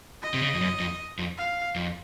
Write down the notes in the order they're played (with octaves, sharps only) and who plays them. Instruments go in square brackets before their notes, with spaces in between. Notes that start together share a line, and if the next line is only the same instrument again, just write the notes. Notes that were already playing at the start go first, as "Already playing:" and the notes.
[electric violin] D#5
[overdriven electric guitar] C3
C#3
F2
F#2
F2
F2
[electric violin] F5
[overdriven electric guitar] F2